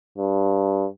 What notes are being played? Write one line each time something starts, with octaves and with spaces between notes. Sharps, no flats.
G2